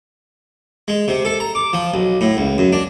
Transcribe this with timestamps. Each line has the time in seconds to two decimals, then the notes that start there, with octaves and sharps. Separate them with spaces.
0.88 G#3
1.08 C3
1.25 A4
1.40 A#5
1.55 D6
1.73 F3
1.94 B1
2.21 A2
2.37 C#2
2.58 F#2
2.73 D4